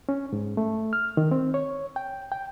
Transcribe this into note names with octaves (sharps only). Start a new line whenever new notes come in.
C#4
G#2
A3
F6
D#3
C4
C#5
G5
G5